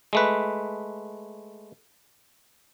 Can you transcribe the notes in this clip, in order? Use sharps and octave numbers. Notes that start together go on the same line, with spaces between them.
G#3 A3 B4